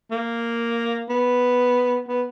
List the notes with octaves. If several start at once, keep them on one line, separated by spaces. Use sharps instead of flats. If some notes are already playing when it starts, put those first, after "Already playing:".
A#3
B3
B3